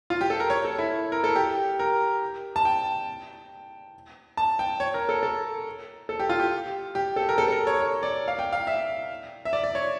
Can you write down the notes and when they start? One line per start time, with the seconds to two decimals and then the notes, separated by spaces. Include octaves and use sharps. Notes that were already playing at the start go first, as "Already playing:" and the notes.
0.10 F4
0.21 G4
0.30 A4
0.40 A#4
0.50 C#5
0.65 A4
0.78 E4
1.12 A#4
1.24 A4
1.36 G4
1.79 A#4
2.56 A5
2.65 G5
4.37 A5
4.59 G5
4.80 C#5
4.94 A#4
5.09 A4
5.23 A4
6.09 A4
6.20 G4
6.29 F4
6.39 G4
6.95 G4
7.16 A4
7.29 A#4
7.38 A4
7.48 A4
7.52 A#4
7.67 C#5
7.81 C#5
8.03 D5
8.28 F5
8.39 G5
8.53 F5
8.67 E5
9.45 E5
9.53 D5
9.64 D5
9.75 C#5